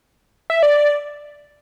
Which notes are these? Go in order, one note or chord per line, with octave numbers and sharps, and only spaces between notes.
E5
D5